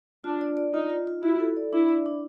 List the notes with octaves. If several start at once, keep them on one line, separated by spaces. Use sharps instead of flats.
D4 F4
D5
D5
D#4 F4
F4
F4
E4 F#4
A4
D5
D4 E4
D5
D4